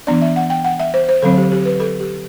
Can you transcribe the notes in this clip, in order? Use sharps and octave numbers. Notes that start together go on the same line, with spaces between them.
E3 B3 D4 D5
E5
F#5
G5
F#5
E5
C5
C5
D3 F#3 C4 A4
G4
G4
B4
A4
G4